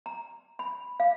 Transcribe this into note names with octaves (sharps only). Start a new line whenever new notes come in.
A#5
B5
F5